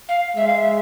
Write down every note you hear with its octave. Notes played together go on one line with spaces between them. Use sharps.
F5
G#3 E5
F5
E5